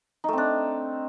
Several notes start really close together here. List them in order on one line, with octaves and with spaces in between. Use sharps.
D#4 A3 C4 D4